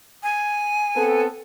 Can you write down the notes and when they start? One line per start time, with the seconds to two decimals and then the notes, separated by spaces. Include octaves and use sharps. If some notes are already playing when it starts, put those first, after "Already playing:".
0.23 G#5
0.96 B3 C4 A4